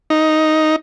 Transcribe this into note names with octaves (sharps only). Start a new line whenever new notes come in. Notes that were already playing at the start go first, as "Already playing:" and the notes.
D#4